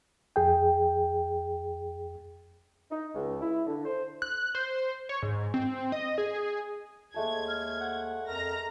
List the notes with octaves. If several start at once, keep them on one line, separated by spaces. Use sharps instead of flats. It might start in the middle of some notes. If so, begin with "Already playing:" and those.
F2 G#4 G5
D#4
C#2
E4
D3
C5
F#6
C5
C#5
G#2
C4
D#5
G#4
D#2 G#3 A3 A5 G#6
F6
F#5
F2 A#4 A#5 A#6